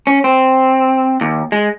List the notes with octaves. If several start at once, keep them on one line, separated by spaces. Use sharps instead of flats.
C#4
C4
D#2
G#3